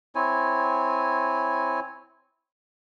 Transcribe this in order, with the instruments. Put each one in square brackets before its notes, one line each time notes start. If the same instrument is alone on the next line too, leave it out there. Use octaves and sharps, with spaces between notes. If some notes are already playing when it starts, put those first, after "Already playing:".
[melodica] C4 E4 C#5 G#5